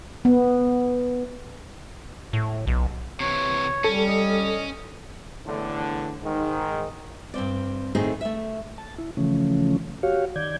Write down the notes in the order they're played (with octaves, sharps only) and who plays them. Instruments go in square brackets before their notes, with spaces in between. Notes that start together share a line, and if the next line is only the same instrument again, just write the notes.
[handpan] B3
[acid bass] A2
B1
[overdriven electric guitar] C3 E3 [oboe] C#5
[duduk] G3 [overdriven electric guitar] C#4 [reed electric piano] A4
[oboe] D#5
[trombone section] E2 A2 D3
G#2 D#3
[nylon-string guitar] G2 B2 C4 D5
A2 D#3 A3 C4 D#4 G#4
A3 E5
[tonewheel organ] A5
E4
C#3 E3 F3 A3 C#4
F#4 G4 C#5 F5
D#3 D5 G6 G#6